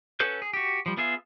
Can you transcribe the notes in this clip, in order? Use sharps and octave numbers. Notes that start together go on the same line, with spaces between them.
C#4 F#4 A4 B4 G6
G#4
F#4 G4
F3 G3
B3 F4 G#4 E5